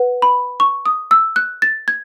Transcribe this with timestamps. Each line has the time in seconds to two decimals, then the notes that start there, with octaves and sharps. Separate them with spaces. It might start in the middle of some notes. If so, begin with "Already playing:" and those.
Already playing: B4 F#5
0.22 B5
0.60 C#6
0.86 D#6
1.11 E6
1.36 F#6
1.62 A6
1.88 G#6